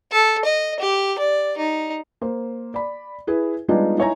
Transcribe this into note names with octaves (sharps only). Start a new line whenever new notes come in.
A4
D#5
G4
D5
D#4
A#3 C5
D5 B5
E4 G#4 B4
G3 G#3 B3 D4 D#4 F4
D#4 E4 C#5 E5 G#5 A#5